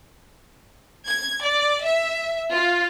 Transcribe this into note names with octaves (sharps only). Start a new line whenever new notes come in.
G#6
D5
E5
F4